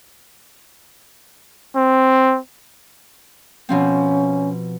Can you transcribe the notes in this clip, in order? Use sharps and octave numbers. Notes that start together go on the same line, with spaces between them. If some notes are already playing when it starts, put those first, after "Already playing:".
C4
B2 F3 C4 C#4